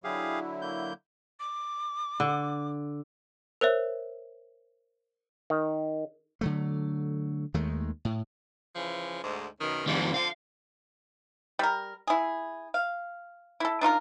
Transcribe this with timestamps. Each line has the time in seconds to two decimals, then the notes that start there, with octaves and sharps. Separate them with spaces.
0.04 D3 F#3 E4 G4 G#4 F5
0.62 A#3 G6
1.40 D6
2.20 D3
3.61 A#4 C5 C#5 E5
5.50 D#3
6.41 D3 F#3 A3
7.54 D#2 D#3 G#3 A3
8.05 A2
8.76 C#3 E3 F3
9.23 D2 G#2
9.60 F#2 B2 D#3
9.87 F2 G#2 D#3 F3 G3
10.14 D3 F3 C4 F5
11.59 G3 A#4
12.07 E4 G#4
12.74 F5
13.60 E4 A4
13.81 D4 D#4 F4 A#4